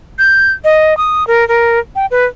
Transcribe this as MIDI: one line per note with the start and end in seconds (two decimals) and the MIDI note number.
0.19 0.52 91
0.64 0.97 75
0.97 1.26 87
1.27 1.47 70
1.48 1.79 70
1.96 2.06 79
2.11 2.25 71